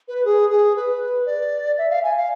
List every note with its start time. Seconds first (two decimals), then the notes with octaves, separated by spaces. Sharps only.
0.08 B4
0.25 G#4
0.50 G#4
0.76 B4
1.26 D5
1.78 E5
1.90 F5
2.03 G#5
2.16 F5